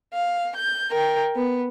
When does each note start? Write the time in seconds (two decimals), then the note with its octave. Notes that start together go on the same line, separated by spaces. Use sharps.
0.14 F5
0.56 G6
0.91 A#4 G5
1.36 B3